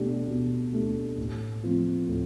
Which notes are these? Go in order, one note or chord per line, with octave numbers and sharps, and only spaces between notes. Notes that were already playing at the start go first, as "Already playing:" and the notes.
Already playing: B2 A3 D4 G4
B2
A3 D4 G4
A2
F3 A3 C4 F4
A2